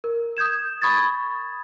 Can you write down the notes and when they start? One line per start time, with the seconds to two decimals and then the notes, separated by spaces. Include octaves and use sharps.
0.04 A#4
0.37 D#6 G6 G#6 E7
0.82 B5 C#6 D#6 G#6 A6